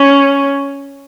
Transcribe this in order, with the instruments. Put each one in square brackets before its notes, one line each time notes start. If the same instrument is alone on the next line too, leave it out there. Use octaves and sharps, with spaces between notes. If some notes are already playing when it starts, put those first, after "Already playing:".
Already playing: [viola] C#4